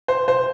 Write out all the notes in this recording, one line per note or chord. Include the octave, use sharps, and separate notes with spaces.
C5
C5